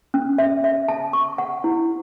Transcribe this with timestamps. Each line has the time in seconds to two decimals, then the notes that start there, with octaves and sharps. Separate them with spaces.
0.14 C#4
0.38 E5
0.64 E5
0.88 A5
1.13 C#6
1.38 F#5
1.64 E4